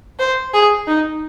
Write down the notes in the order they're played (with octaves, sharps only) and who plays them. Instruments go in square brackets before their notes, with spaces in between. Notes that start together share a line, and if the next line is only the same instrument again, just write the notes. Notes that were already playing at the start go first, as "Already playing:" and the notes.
[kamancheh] C5
G#4
D#4